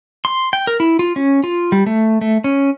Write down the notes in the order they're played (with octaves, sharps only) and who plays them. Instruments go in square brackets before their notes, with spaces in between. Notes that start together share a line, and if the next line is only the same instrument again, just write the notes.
[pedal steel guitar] C6
G5
A#4
E4
F4
C#4
F4
G3
A3
A3
C#4